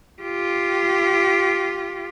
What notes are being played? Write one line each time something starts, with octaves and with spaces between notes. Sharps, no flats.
F4 G4